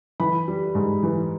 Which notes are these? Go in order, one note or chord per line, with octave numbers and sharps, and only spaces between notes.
E3 B5
G3
G#2
E3